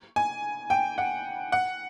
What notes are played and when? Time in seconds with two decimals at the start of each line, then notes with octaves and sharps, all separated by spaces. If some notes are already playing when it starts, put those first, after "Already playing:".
0.16 G#5
0.70 G5
0.98 F#5
1.52 F#5